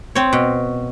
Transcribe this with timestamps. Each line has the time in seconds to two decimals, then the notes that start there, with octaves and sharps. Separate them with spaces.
0.15 C4 C#5
0.33 B2